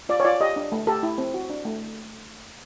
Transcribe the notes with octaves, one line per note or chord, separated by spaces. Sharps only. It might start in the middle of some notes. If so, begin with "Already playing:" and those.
F4 D5
C#5
F4 D5
G4 D#5
D4
A3
G4 A4
E4
C4
F#4
D4
A3